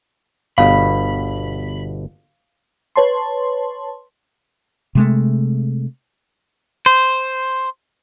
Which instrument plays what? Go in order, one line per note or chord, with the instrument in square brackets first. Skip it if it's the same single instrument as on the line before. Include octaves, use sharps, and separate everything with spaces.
[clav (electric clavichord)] G1 B2 [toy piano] F5 [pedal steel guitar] B5
[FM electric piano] B4 C#5 A5 C6
[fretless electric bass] C3 G#3 A3
[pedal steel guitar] C5